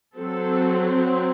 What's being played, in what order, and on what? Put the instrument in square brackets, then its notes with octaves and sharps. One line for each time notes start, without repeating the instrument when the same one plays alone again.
[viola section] F#3 C4 A4